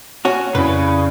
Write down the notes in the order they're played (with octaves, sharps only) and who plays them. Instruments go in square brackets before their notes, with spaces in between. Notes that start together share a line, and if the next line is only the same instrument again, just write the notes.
[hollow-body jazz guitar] C#4 F#4
[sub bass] F2 [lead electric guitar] C#3 [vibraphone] E4 D5 [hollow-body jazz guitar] B4